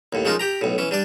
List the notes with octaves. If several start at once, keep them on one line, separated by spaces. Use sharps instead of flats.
D#2 A2
F3 G#3 C#4 D#4 F4 A#4
G4 G5 A#5
B1 A2
E3 C#4
G3 D4 D5